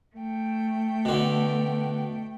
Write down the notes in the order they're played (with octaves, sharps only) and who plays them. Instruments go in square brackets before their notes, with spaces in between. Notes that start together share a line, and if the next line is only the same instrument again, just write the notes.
[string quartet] A3 G5
[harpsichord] B2 D3